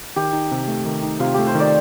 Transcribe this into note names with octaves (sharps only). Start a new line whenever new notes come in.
D#3 G4
D#4
C3
A3
D#3
D#4
C3 F4
A3 G4
C5
D#3
D5